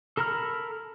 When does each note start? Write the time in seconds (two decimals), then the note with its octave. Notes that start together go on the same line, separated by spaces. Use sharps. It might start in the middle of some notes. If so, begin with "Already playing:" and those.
0.17 A4 A#4 A#5 B5 F6